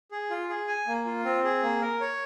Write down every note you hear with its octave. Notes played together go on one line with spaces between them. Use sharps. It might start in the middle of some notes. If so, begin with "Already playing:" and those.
G#4
F4
G#4
G#5
A#3
F4
C4
G#4
A#3
A#4
C#5